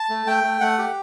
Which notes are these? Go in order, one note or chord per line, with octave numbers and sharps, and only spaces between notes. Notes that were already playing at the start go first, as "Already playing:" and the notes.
Already playing: A5
A3
A3 G5
A3
A3 F#5
G4